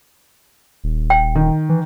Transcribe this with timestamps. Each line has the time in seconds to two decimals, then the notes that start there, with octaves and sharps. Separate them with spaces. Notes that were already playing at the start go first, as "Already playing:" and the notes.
0.84 D#1
1.10 G5
1.35 D#3
1.69 E3